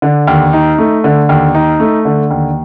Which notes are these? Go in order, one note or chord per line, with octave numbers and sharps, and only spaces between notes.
D3
D#2
D#4
A3
D3
D#2
D#4
A3
D3
D#2